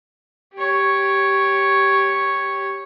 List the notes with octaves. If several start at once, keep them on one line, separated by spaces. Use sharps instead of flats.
G4 C#5